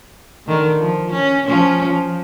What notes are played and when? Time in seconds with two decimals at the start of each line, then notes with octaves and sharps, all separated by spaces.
0.47 D3 D#3
0.80 F3
1.11 C#4
1.47 F3 C#4
1.88 F3